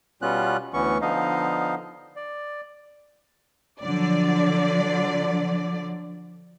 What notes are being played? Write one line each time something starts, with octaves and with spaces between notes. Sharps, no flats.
B2 G3 B3 C#4 F4 F#6
D2 E3 B3 C#4 C#6
D3 F3 B3 D#4 D#5 F5
D5
D3 F3 F#3 D5